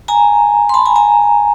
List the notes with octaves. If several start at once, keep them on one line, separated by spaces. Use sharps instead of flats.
G#5 A#5
C6
A5 B5
G#5 A#5
G#5 A#5